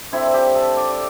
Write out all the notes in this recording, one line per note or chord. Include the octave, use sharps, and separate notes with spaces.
D3 C4 E4
G4
A4
D5
D5